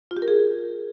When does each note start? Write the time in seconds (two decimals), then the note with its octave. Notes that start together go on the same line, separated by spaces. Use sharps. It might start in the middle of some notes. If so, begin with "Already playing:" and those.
0.11 F4
0.17 G4
0.22 A#4
0.28 G#4